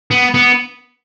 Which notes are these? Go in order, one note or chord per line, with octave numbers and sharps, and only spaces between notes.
B3
B3